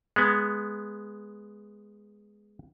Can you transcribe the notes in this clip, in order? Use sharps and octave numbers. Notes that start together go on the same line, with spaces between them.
G#3 B3